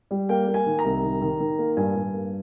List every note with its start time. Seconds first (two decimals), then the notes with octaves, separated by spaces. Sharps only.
0.11 G3
0.29 A#3 G5
0.48 A#3
0.54 G#5
0.66 D#3
0.79 A#5
0.84 C2
1.03 D#3
1.21 D#3
1.40 D#3
1.59 A#3
1.77 G2 G#5
1.95 G2
2.14 A#3